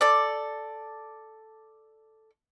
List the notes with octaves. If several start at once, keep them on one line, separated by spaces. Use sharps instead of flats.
A4 D5